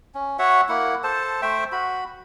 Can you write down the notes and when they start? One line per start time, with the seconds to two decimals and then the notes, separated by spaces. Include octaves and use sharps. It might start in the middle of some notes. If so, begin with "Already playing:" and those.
0.15 C#4
0.39 F#4 C#5 E5 F#5
0.69 A#3 E4 F#5
1.04 A4 C5 A5
1.42 A3 C5 E5 G5
1.72 F#4 B5